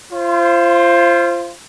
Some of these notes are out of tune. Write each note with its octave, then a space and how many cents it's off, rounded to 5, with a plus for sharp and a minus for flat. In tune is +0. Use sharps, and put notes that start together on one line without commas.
F4 -30 C5 +10